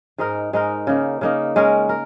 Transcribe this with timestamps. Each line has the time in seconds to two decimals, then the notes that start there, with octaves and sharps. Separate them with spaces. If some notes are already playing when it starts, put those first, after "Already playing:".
0.18 G#2 G#3 D#4 A#4
0.53 G#2 G#3 D#4 A#4
0.87 C#3 A#3 D#4
1.21 C#3 A#3 D#4
1.56 G#3 C#4 A#4
1.89 A#4